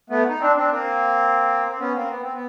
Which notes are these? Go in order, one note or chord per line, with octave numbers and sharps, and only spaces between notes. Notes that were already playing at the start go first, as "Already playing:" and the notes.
A3 B3
D#4
C4 D4
C4 D4
A#3 C4
C4
B3 C#4
A#3 C4
B3
C4
B3